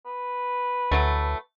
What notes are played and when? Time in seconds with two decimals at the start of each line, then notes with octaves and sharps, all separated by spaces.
0.06 B4
0.91 D2 E3 F#3 A3